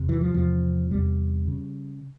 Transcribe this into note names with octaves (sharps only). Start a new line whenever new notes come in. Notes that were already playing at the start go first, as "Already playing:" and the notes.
Already playing: E2 C3
E3
F3
E2 C3 F3
E2 C3 G3
C#3